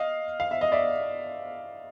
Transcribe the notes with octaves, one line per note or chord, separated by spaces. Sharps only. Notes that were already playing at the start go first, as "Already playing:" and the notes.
Already playing: D#5 F5
F5
E5
D#5
D5 E5